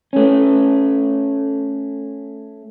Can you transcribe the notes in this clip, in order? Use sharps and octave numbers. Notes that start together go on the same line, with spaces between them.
A3 C#4